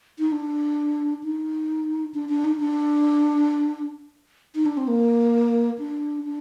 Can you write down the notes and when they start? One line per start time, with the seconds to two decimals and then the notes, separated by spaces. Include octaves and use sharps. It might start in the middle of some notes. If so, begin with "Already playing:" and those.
0.19 D#4
0.32 D4
1.23 D#4
2.14 D4
2.29 D4
2.45 D#4
2.60 D4
4.55 D#4
4.66 D4
4.77 C4
4.88 A#3
5.79 D4
6.24 D4